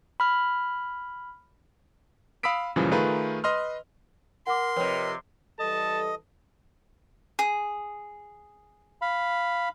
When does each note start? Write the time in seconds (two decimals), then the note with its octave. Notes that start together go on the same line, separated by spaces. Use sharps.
0.20 B5 F6
2.43 F5 B5 D#6 E6 B6 D7
2.76 F#2 A#2 C#3 E3 F3 G3
2.91 D#3 A3 F4 G#4 A#4 B4
3.44 B4 D#5 C6 F6
4.47 A#4 F#5 C6 D6
4.76 F2 C3 B4 C#5 G5
5.60 E3 G3 A4 D#5 A5
7.39 G#4
9.02 F5 B5